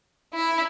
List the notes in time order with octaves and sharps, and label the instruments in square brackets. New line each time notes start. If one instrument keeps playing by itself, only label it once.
[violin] E4